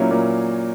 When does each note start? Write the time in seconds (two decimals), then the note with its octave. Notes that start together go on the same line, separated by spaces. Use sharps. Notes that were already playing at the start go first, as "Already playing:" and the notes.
Already playing: A#2 F#3 A#3 C#4 E4
0.11 A#2